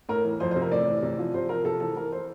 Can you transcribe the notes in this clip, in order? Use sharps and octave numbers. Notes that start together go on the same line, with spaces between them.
A2 A#4
E3
F2 C5
C5
C3
A#4
A2 D5
E3
C3
F3
C3 C5
F3 A#4
C3 A4
E3 A4
E3 A#4
C5